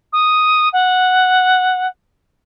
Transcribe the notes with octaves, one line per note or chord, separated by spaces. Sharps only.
D#6
F#5